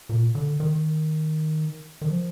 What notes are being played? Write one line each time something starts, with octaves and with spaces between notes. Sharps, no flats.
A#2
D3
D#3
D#3
F3